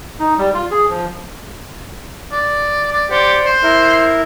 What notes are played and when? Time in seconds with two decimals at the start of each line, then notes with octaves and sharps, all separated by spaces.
0.19 D#4
0.38 G3
0.54 F4
0.71 G#4
0.89 F3
2.32 D5
2.93 D5
3.11 G4 C5 D5 F#5
3.46 C5
3.63 E4 A#4